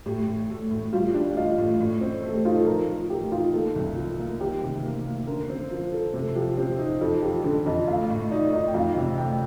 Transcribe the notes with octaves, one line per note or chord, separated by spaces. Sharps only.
A2 G4
A2
A3
A2
G3 F4
D4 G4
F4 D#5
A2
A2
C4
A3 A4
G4
D#4 F4
A4
F3 A#4
F3
A3 G4
D#4 F4
A#3 A4
C2
F3
A#3
D#3 G4
C3
A#3
A#3
D3 A#4
C4
F3
F3 A4
C3 A4
F3 G4
C4 G4
D#4
F2 A4
F3 G4
D3 A4
F2 D#5
A3 F5
A2
D#4 D5
D#4 D#5
G5
F2 F5
C3 G5
A3 G5